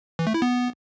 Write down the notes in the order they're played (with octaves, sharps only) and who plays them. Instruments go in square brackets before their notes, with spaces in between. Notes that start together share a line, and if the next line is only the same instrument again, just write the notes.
[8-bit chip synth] E3
A3
E4
B3